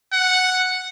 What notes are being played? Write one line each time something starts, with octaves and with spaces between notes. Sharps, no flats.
F#5